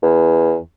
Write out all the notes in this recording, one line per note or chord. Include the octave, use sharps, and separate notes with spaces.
E2